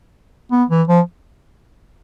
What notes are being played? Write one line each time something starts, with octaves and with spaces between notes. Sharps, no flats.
B3
E3
F3